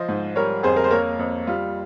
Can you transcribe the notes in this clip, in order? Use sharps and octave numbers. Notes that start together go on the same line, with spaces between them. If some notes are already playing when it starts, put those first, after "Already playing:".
Already playing: F3 C5 D#5
G#2
G3 A#4 C#5
F2 G#4 C5
A#4
C5
A#3 A#4 C#5
F2
G3 F4